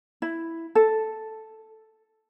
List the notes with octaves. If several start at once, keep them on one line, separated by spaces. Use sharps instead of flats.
E4
A4